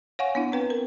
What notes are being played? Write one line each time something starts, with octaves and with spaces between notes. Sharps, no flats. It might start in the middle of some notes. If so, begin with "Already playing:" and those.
C#5 F5 F#5 G#5 C#6
B3 D4 E4
C4 B4 G5
A#4